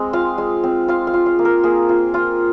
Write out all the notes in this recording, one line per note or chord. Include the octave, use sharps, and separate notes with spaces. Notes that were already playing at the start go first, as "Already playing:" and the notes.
Already playing: G#3 C4 D#5
F4 F5
G#3
C4
F4 F5
F5
F4
F5
A#3
A#4
A#3 G#4
F4
F4